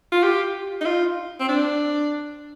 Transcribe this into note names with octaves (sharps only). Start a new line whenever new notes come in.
F4
G4
D#4
F4
C4
D4